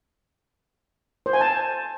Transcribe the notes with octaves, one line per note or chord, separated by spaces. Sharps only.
C5
G#5
A5